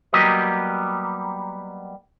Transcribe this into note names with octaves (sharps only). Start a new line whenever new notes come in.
F#3 G3 A#3 B3 G4 D#5